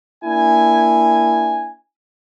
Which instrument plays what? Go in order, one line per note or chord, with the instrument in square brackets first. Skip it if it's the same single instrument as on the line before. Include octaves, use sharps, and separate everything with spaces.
[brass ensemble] A#3 D4 E4 G#5